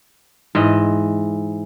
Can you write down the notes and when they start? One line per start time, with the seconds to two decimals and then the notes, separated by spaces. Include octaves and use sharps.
0.55 G#2 E3 D#5